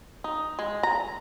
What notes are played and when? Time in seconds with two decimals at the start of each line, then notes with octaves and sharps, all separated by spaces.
0.24 D#4
0.59 G#3
0.83 A#5